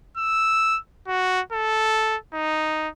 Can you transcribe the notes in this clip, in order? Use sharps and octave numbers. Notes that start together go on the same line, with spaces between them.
E6
F#4
A4
D#4